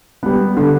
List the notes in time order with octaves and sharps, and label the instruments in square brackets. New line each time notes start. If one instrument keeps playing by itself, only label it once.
[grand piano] G3 B3
D3